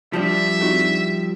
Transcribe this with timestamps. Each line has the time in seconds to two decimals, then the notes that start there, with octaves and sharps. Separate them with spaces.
0.13 F3 G3 D4 E5 A5
0.61 C4 D#4 F#4